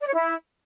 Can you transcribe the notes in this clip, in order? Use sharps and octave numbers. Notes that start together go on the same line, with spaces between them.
D5
C#5
E4